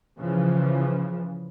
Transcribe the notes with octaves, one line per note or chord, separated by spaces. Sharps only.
C#3 E3 F3